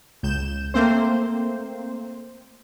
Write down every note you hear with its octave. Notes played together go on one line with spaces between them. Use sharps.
C#2 G6 E7
A3 A#3 C4 C5